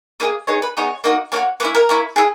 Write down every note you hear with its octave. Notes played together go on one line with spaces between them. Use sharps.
A#3 E4 G#4 D#5
B3 D#4 G#4 C#5
B4
B3 D#4 G#4 C#5
A#3 D#4 F#4
A#3 D#4 F#4 C#5
A#3 C#4 E4 B4
A#4
A#3 C#4 E4
E4 G#4